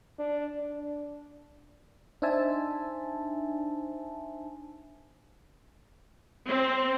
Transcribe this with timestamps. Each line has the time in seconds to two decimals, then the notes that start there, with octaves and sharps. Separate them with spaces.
0.19 D4
0.60 D4
2.22 D4 D#4 C5 E5 G#5 A5
6.46 C4